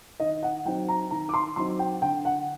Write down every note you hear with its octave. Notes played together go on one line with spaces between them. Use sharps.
D#3 D#5
F#5
F#3 C4 D#4 G5
A#5
D#3 A#5
D6
C6
F#3 C4 D#4 C6
G5
D3 G5
F#5